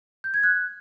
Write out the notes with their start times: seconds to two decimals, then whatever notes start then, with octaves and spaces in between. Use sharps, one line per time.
0.24 G6
0.34 G#6
0.44 F#6